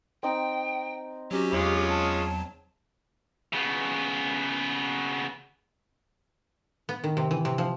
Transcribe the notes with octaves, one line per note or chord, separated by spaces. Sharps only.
C4 D#4 G5
F#3 C#4 F#4 G4
E2 F#3 G#3 C#4 F4
A5
C#3 B3
B3
D#3
C3
E3
C3
F3